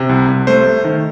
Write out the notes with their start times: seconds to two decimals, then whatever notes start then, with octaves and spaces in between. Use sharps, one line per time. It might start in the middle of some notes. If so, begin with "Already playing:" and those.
Already playing: C3
0.09 C2
0.28 C2
0.47 A3 C5
0.66 A3
0.85 D#3